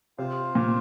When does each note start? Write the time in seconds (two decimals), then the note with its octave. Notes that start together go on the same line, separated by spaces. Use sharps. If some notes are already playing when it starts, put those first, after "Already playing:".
0.18 C3 F4 C5 F5
0.55 A#2